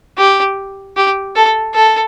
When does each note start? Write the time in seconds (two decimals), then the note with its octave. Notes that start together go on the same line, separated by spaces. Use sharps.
0.18 G4
0.96 G4
1.36 A4
1.74 A4